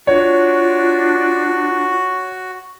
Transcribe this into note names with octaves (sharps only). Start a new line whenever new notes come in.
D4 F4 F#4 C#5